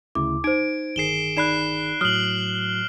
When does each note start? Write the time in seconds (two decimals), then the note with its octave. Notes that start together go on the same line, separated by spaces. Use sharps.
0.15 D2 C#3 E4 D6
0.44 D#4 C5 G#6 D7
0.96 G1 D#3 G#4 C7 E7 G7
1.37 D#4 D5 B5 F#6 C7 E7
2.01 A2 F#3 D#6 F6 F#7